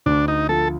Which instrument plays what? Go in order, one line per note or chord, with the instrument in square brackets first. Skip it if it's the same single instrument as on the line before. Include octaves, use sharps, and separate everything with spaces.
[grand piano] D2 [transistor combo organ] D4
[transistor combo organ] D#4
[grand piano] F3 [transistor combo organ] A4